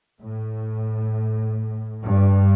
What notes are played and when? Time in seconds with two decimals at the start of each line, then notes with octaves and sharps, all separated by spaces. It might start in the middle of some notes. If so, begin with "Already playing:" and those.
0.22 A2
2.04 G2